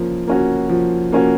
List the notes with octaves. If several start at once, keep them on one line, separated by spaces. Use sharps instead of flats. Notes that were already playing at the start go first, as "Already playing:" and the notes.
Already playing: F3 A#3 C#4
A#3 C#4 F#4
F3
A#3 C#4 F#4